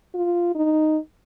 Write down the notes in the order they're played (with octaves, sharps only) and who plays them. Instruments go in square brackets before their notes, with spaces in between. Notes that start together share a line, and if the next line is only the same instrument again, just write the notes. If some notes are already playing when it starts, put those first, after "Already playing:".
[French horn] F4
D#4